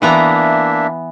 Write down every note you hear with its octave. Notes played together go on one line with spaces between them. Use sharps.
E3 A#3 B3 D4 E5 A#5